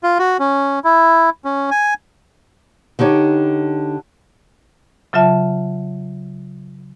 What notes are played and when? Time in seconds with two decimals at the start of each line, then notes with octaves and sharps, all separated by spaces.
0.03 F4
0.19 F#4
0.39 C#4
0.84 E4
1.45 C#4
1.71 G#5
2.99 D3 D#4 G4 C#5
5.13 C#3 F#3 F4 E5 A5